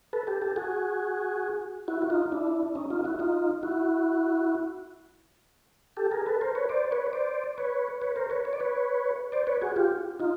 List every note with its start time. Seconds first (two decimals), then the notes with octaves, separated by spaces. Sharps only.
0.13 A4 B4
0.27 G4 A4
0.42 G4 A4
0.56 F#4 G#4
1.88 E4 F#4
2.02 F#4
2.10 D#4 F4
2.32 D4 E4
2.75 C#4 D#4
2.90 D#4 F4
3.04 E4 F#4
3.19 D#4 F4
3.63 E4 F#4
5.97 G4 A4
6.11 G#4 A#4
6.26 A4 B4
6.41 A#4 C5
6.55 B4 C#5
6.69 C5 D5
6.91 B4 C#5
7.13 C5 D5
7.58 B4 C#5
8.02 B4 C#5
8.16 A#4 C5
8.30 B4 C#5
8.45 C#5
8.53 D5
8.60 B4 C#5
9.32 C5 D5
9.47 B4 C#5
9.61 F#4 G#4
9.76 F4 G4
10.20 D#4 F4